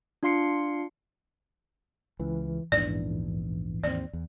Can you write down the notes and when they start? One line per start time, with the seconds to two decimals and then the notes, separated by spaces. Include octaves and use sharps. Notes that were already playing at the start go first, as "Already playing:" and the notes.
0.23 D4 F4 F5 C6 C7 C#7
2.20 C#2 E3
2.72 A#1 E2 G#2 E3 D4 D5
3.83 D#2 C4 D5
4.13 E2